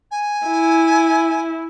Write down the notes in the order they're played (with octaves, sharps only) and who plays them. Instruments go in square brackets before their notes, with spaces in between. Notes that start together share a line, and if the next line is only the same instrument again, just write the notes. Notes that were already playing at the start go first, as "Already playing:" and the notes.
[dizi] G#5
[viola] E4